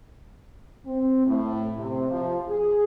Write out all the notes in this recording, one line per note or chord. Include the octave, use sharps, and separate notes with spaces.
C4
A2
C3
F3
G#4